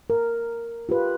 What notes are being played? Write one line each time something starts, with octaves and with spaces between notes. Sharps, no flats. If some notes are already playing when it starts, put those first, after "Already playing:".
A#4
F4 G4 B4